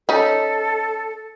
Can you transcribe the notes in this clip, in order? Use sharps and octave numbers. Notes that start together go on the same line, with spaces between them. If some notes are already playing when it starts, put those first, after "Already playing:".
C#4 D#4 A4